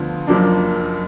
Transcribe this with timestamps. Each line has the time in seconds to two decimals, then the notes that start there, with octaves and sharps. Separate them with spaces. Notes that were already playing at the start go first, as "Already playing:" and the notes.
Already playing: D2 D3 F3 B3 F4
0.27 F#1 F#2 F3 A#3 D4